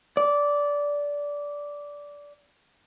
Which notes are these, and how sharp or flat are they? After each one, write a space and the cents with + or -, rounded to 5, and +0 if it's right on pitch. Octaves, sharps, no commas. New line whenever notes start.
D5 -15